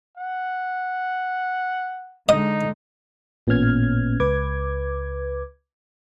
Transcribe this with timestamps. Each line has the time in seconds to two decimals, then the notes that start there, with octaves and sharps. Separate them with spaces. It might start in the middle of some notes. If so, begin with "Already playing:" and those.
0.17 F#5
2.29 D3 G#3 D#4 D#5
3.47 A1 A#2 B3 C#4 F6 G#6
4.20 C#2 B4 D6 G#6